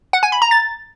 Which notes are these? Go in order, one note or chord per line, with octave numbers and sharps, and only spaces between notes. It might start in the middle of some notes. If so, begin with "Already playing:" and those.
F#5
G#5
B5
A#5
A6